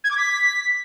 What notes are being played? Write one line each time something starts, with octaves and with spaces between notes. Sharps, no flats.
G#6
D6
B6